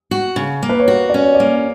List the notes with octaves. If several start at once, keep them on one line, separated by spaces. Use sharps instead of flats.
F#4
C#3
A#3
B4
C#5
F#4
C#4 D5
C#5
D5
A#3
C#5